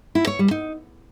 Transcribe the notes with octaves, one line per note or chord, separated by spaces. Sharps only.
E4
C#5
G3
D#4